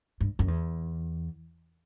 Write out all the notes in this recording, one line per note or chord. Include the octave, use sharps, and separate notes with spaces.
G2
F#2
E2